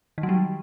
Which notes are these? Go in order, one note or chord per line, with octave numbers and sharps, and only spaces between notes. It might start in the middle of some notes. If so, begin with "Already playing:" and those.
D#3
F#3
G3